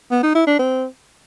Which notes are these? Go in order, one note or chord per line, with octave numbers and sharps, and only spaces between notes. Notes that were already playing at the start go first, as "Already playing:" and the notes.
B3
D#4
E4
D4
C4